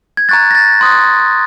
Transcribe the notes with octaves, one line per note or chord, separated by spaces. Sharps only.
G#6
A#5 C#6 F#6 A6
A#6
A6
C6 D#6 F#6